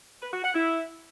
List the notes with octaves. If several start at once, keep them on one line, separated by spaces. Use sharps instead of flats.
B4
F#4
F#5
E4